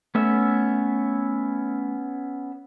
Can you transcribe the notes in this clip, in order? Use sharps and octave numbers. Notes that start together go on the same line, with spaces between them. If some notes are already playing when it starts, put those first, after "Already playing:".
A3 B3 C#4 E5